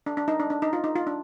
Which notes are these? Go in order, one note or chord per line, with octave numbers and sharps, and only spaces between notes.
D4
D4
D#4
D4
D4
D#4
F4
D#4
F4
D4